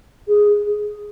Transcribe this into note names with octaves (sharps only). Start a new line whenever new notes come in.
G#4